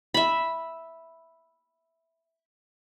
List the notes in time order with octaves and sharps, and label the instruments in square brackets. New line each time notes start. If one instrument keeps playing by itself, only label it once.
[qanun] E5 B5